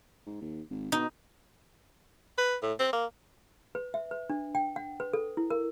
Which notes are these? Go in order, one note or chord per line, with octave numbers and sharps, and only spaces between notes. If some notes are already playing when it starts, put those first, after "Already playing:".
G#2
D#2
G#1
B2 D#4
B4
A2
C4
A#3
B4
E5
B4
D4
G5
F#5
B4
A4
E4
A#4